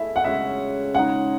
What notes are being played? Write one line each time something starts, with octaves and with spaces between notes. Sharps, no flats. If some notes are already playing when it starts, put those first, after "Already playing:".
Already playing: A3 E4 G#4 E5
F#5
C#3 G#3 C#4 F#4 E5
C#3 G#3 D#4 F#5